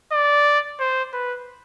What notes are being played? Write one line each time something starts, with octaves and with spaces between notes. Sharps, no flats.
D5
C5
B4